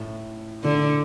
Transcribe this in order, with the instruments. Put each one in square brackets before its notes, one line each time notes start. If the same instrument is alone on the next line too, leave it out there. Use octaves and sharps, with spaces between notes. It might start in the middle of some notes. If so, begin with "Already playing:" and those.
Already playing: [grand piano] A2
[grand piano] A2 [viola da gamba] D3